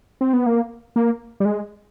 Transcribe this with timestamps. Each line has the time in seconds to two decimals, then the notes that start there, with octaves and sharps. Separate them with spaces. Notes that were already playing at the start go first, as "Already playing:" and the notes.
0.21 C4
0.33 B3
0.46 A#3
0.96 A#3
1.40 G3
1.45 G#3